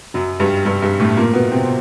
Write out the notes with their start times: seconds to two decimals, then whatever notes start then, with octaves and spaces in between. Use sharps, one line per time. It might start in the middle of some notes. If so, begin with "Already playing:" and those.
0.14 F#2 F#3
0.40 G2 G3
0.65 G2 G3
0.82 G2 G3
0.99 A2 A3
1.17 A#2 A#3
1.34 B2 B3
1.51 C3 C4